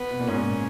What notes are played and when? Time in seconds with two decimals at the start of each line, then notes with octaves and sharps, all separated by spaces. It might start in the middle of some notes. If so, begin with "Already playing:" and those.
Already playing: B3
0.11 B2
0.19 A#2
0.27 G#2 C#4
0.37 A#2